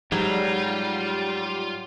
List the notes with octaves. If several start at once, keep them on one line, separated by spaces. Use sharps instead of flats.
G#2 F#3 G3 F4